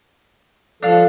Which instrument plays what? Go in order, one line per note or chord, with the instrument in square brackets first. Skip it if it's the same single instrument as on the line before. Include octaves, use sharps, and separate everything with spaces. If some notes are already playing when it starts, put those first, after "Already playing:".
[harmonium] F3 A4 [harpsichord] D4 F5